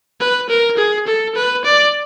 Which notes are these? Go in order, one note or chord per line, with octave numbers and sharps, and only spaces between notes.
B4
A#4
G#4
A4
B4
D5